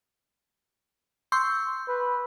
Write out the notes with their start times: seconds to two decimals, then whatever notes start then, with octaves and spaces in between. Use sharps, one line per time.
1.32 C6 C#6 E6 G6
1.88 B4